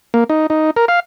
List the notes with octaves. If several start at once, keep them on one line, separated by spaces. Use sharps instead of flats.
A#3
D#4
D#4
A#4
F5